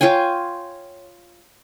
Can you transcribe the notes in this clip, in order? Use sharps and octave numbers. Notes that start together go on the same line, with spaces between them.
F4 C#5 G5 G#5